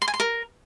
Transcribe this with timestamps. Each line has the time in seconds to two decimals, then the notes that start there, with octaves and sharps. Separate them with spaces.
0.02 C6
0.08 G#5
0.14 C6
0.20 A#4